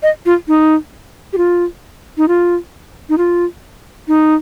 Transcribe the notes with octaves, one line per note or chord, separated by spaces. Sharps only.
D#5
F4
D#4
G4
F4
D#4
F4
D#4
F4
D#4